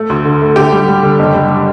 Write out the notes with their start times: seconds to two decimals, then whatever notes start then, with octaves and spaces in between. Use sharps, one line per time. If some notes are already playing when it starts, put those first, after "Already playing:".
Already playing: A3
0.10 D2
0.25 D3
0.41 A3
0.56 D3 G4
0.72 G3
0.88 G3
1.03 D3
1.19 F#1
1.34 G3